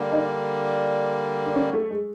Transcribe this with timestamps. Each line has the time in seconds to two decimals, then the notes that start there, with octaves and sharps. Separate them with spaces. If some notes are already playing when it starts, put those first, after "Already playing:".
Already playing: D3 G3 A#3
0.12 D#4
0.17 D4
1.45 D4
1.56 C#4
1.73 A3
1.90 G#3